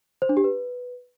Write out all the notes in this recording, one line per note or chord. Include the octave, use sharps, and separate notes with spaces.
C5
D4
G4
B4